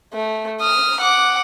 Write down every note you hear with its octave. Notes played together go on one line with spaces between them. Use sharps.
A3
D#6 F6
F#5 D6